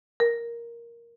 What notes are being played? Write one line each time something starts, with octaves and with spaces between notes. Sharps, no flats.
A#4